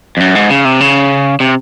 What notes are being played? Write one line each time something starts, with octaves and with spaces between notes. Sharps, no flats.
F2
F#2
G#2
C#3
C3
C#3
C3